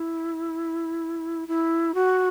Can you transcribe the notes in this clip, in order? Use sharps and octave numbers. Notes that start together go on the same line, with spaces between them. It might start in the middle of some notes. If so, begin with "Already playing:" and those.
Already playing: E4
E4
F#4